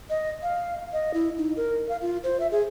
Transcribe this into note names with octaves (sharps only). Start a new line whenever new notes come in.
D#5
F5
D#5
E4
D#4
A#4
F5
F4
C5
E5
G#4